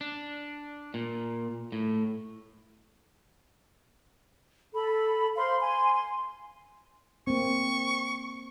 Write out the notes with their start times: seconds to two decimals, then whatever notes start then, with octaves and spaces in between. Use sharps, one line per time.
0.01 D4
0.94 A#2
1.72 A2
4.74 A4 B5
5.37 C5 F5 B5 C6
5.60 G#5 C6
5.95 C6
7.27 A#3 C4 C#6